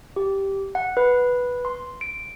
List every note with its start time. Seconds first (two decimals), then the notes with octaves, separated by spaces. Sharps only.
0.16 G4
0.75 F#5
0.97 B4
1.65 C6
2.01 D7